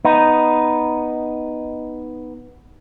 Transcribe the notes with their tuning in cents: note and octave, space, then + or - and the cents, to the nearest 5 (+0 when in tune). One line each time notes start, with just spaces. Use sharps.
B3 +0 D#4 +0